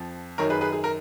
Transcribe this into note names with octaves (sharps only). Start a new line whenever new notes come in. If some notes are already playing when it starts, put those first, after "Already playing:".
Already playing: F2 F3
F#2 D#3 A#4 C#5
G#4 B4
G#4 B4
G#4
A#4